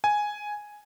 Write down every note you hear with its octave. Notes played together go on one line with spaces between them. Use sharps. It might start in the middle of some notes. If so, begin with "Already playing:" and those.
G#5